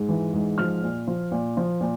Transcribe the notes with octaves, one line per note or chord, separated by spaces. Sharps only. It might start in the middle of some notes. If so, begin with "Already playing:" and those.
Already playing: G#2
E3
G#2
F3 F6
A#2
F3
A#2
F3
A#2